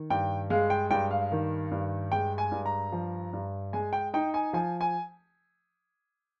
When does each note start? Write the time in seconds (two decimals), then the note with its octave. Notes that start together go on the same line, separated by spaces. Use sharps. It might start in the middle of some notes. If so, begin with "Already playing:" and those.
Already playing: D#3
0.10 G2 G5
0.50 G#3 F5
0.70 G5
0.91 G2 G5
1.11 F5
1.32 D#3
1.71 G2
2.12 G#3 G5
2.38 G#5
2.51 G2
2.66 A#5
2.92 F3
3.33 G2
3.73 G#3 G#5
3.93 G5
4.13 D#4 G5
4.34 G#5
4.53 F3 G#5
4.81 G#5